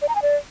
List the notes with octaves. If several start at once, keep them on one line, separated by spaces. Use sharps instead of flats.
D5
A#5
G#5
D5